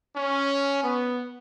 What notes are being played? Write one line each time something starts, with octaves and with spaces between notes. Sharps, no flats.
C#4
B3